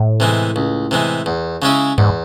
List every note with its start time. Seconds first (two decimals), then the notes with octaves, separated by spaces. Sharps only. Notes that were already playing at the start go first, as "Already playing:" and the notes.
Already playing: A2
0.20 C3 E3 G#3
0.56 C#2
0.91 C3 E3 G#3
1.26 E2
1.62 C#3 G#3 C#4 E4
1.98 E2 G#2